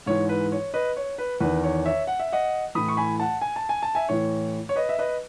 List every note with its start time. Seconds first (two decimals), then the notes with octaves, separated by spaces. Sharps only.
0.06 G#2 E3 C#5
0.29 B4
0.52 C#5
0.74 B4 D#5
0.97 C#5
1.18 B4
1.40 E2 D#3 B4
1.64 C#5
1.86 C#5 E5
2.07 F#5
2.20 E5
2.32 D#5 F#5
2.75 A2 E3 B5 D#6
2.88 C#6
2.97 G#5 B5
3.20 F#5 A5
3.42 G#5
3.56 A5
3.69 G#5
3.82 A5
3.95 E5 G#5
4.09 A2 E3 C#5
4.69 C#5
4.76 B4 D#5
4.89 E5
4.99 B4 D#5